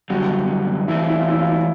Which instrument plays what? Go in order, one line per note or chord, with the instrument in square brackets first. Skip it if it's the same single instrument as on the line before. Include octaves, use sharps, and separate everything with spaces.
[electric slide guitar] F#2 D3 G3 [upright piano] F#4
[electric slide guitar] E3 A3 C4 [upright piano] E4
[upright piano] F4
E4
F4
E4
F4
E4